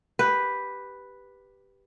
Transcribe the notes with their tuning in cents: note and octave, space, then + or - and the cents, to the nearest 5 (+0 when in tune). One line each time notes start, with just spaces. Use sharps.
G4 +0 B4 +0